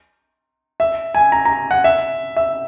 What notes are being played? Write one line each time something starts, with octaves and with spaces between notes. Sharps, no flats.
E5
G#5
A#5
A#5
F#5
E5
E5